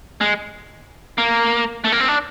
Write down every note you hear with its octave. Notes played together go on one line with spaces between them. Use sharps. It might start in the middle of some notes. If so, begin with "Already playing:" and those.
G#3
A#3
A3
A#3
C4
D4